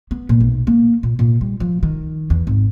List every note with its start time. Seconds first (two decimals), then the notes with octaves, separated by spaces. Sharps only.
0.11 B3
0.29 A#2
0.41 B1
0.67 A#3
1.03 A#2
1.19 A#2
1.41 G3
1.60 F3
1.83 D#3
2.30 E2
2.47 G#1